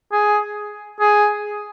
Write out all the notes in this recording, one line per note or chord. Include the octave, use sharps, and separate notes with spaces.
G#4
G#4